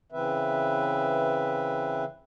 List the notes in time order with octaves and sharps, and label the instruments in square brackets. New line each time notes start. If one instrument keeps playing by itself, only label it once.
[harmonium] C#3 E3 C4 B4 E5